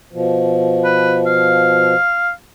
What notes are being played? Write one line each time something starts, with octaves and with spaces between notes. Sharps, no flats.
B2 F3
B4
F5